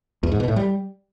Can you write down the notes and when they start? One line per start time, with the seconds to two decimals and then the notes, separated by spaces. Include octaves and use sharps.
0.23 E2
0.32 G#2
0.40 B2
0.48 A2
0.56 G3